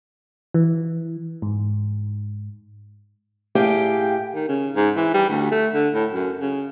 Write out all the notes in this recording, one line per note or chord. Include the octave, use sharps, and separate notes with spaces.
E3
G#2
A2 G4 G#4 F5 G5
D#3
C#3
G#2
E3
G3
D2
A3
D3
A2
F#2
C#3